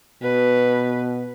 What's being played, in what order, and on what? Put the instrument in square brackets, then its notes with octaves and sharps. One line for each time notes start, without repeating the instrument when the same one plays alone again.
[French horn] B2 [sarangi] B4